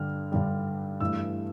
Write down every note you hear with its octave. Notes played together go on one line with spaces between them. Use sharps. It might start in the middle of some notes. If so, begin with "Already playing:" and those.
Already playing: G2 D3 G3 F6
G2 D3 G3
G2 E3 A3 E6